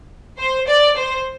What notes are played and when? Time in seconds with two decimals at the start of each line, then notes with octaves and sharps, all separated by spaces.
0.38 C5
0.67 D5
0.96 C5